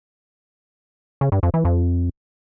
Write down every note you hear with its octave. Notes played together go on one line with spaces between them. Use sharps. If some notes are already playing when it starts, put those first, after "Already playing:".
C#3
G2
F2
E3
F2